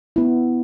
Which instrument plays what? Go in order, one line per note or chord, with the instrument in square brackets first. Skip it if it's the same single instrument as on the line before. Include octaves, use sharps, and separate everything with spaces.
[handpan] B3 E4